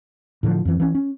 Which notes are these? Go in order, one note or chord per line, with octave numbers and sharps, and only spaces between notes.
A2 D3 D#3 F3
F2 E3
E3 C#4
C#4